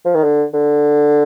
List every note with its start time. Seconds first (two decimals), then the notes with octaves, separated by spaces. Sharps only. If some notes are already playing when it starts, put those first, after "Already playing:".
0.05 F3
0.15 D#3
0.23 D3
0.53 D3